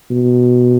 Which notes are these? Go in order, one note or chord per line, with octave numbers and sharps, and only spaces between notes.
B2